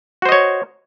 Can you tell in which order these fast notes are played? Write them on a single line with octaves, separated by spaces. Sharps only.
F#4 C5 D#5 C#5